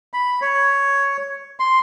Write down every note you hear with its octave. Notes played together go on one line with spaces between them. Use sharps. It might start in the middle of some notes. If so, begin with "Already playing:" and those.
B5
C#5
C6